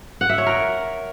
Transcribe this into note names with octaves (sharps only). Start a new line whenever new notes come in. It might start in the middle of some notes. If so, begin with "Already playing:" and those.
F#5
E5
C#5
A#4